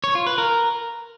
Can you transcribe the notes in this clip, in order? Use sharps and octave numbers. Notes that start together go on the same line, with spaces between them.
C#5
F4
B4
A#4